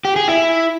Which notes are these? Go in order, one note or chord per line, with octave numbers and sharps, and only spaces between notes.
G4
G#4
E4